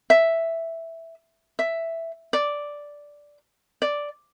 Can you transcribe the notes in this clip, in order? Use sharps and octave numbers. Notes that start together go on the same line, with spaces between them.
E5
E5
D5
D5